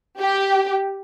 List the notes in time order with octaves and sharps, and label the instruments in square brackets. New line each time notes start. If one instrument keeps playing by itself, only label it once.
[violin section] G4